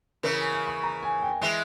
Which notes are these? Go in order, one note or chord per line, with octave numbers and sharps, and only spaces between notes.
C#3 E3 A#4
G#5
G#5
C#6
A#5
G#5
G5
E3 G#3 E5